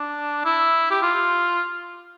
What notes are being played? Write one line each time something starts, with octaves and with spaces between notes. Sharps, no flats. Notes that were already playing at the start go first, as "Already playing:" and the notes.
Already playing: D4
E4
G4
F4